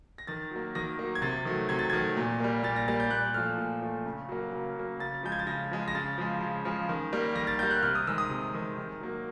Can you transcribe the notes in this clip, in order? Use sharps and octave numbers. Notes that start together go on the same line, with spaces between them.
A#6
D#3 A6
F#3 A#3
D#3 A#6
F#3 A#3
G#6
C3 A6
D#3 F#3 A3
C3 G#6
A6
D#3 F#3 A3 G#6
A#2
G3 A#3
A#2 A6
A#6
G3 A#3 A6
G6
A#2 F#6
F3 A3 F6
A#2
F3 A3
C#3
F#3 A#3
C#3
F#3 A#3
C#3 A6
F3 G#3 G6
G#6
A6
C#3 A#6
F3 G#3
A#6
C#3 A6
F3 G#3
C#3
F3 G#3
D#3
G3 A#3
D#3 A#6
A6
G3 A#3 G6
F#6
C3 F6
D#6
D#3 G#3 E6
D#6
C3
D#3 G#3
D#3
F#3 A#3